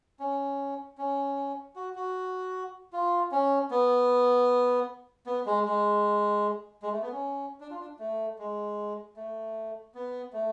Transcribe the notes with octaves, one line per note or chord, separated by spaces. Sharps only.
C#4
C#4
F#4
F#4
F4
C#4
B3
B3
G#3
G#3
G#3
A3
B3
C#4
D4
F4
D4
A3
G#3
A3
B3
A3